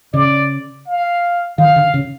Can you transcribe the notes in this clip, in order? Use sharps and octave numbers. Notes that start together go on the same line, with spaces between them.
C#3 D5
F5
D#3 F5
D3
C#3